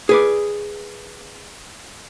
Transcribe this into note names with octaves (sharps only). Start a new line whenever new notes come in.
G#4 B4 D5